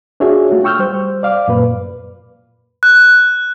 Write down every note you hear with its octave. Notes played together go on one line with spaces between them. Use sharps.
D4 F4 F#4 G#4 C#5 E5
A3 F4 F#4
G5 C#6 E6 F6 G6
G3 C5
D5 F5 D6
F#2 A#2 B4
F#6